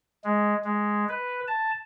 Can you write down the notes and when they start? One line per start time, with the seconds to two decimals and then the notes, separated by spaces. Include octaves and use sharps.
0.24 G#3
0.65 G#3
1.09 B4
1.48 A5